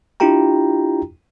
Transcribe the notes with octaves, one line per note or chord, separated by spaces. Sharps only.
D4 E4 F4 G4 G5 A#5